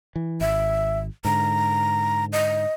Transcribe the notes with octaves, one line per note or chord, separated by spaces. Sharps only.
E3
G#1 E5
G#2 D3 A#5
D#5